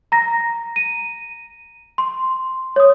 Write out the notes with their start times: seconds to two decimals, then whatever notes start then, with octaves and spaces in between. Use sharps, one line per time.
0.12 A#5 A#6
0.76 D#7
1.98 C6
2.76 C#5 D#6